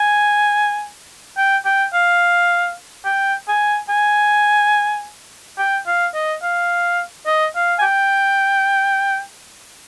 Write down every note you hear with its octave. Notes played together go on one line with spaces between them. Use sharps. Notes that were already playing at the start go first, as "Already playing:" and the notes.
Already playing: G#5
G5
G5
F5
G5
G#5
G#5
G5
F5
D#5
F5
D#5
F5
G#5
G5